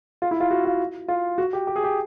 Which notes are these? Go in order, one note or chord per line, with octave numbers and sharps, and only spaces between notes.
F4
E4
F4
F#4
F4
F4
F#4
G4
G4
G#4
G4